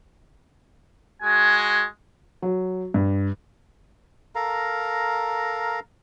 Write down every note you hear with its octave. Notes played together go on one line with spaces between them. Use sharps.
G#3 F#4 G#5
F#3
G2
A4 A#4 F5 A#5